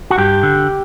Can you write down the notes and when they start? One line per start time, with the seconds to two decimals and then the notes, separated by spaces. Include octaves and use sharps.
0.10 F#4
0.18 G2 G4
0.43 D3